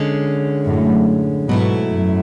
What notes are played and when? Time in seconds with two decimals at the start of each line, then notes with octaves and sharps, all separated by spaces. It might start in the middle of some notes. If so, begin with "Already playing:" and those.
Already playing: D3 G#3 C#4
0.65 F#2 A2
1.48 G#2 B2 F#3 A3 E4
1.90 F#2